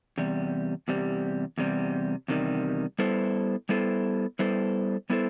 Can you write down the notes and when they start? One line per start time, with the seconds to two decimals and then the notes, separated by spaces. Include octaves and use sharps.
0.18 E2 C3 G3
0.88 E2 C3 G3
1.58 E2 C3 G3
2.28 E2 C3 D#3 G3
2.99 G3 B3 E4 A4 C5
3.69 G3 B3 E4 A4 C5
4.39 G3 B3 E4 A4 C5
5.10 G3 B3 E4 A4 C5